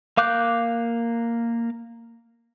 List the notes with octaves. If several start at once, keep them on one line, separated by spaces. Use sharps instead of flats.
A#3 F5 D6 F#6 G6